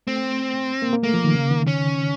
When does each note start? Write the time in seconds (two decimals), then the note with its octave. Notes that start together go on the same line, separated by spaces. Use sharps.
0.07 A3 C4
0.82 A#3
0.93 A#3
1.03 A3 A#3
1.14 F3
1.24 D#3
1.35 C#3
1.51 D#3
1.67 C#4